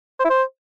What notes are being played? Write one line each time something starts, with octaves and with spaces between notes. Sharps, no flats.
C5
E4
C5